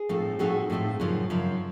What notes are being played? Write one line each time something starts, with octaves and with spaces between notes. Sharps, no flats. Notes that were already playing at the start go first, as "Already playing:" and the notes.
Already playing: G#4
A2 F3 A3 C4 D#4
A2 F3 A3 C4 D#4 F#4 G#4
A2 F3 A3 C4 D#4
F#2 C#3 F3
F#2 C#3 F3